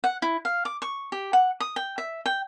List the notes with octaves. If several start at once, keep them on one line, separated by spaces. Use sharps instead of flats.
F#5
E4
F5
D6
C#6
G4
F#5
D#6
G5
E5
G5